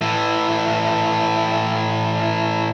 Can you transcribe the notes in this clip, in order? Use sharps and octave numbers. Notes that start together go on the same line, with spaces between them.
A2 E3